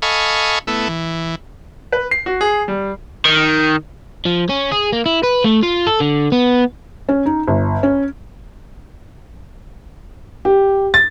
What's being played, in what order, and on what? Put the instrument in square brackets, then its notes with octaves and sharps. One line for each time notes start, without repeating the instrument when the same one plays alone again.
[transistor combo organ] A4 D#5 F5 G#5 B5 C#6
A3 B3 E4
E3
[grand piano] B4
C7
F#4
G#4
G3
[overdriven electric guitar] D#3
F3
C#4
G#4
A#3
E4
B4
A3
F4
A4
D3
B3
[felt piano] C#4
D#4
G1
C#4
[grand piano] G4
A6